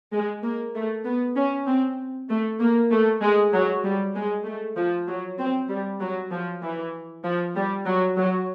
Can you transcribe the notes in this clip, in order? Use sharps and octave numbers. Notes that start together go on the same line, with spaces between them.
G#3
A#3
A3
B3
C#4
C4
A3
A#3
A3
G#3
F#3
G3
G#3
A3
F3
F#3
C4
G3
F#3
F3
E3
F3
G3
F#3
F#3